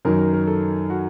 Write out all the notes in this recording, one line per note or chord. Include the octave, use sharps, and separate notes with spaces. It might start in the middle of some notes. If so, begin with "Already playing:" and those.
F#2 D#3 F#3 A#4
A#4
A#4
A4
F#4